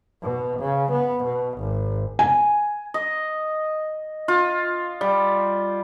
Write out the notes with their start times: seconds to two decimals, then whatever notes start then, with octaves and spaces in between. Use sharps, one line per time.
0.23 B2
0.60 C#3
0.92 B3
1.24 B2
1.58 G#1
2.19 G#5
2.94 D#5
4.28 F4
5.01 G3